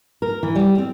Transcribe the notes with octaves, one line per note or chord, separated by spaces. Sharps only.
A#4
E3
G3
C4